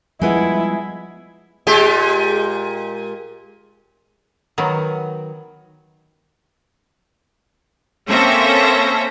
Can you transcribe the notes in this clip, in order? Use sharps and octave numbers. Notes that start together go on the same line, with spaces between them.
F3 G3 G#3 B3 E4 B4 F#5
A#2 G#3 G4
D#3 F#3 B3
A#3 C4 C#4 A4 E5 A#6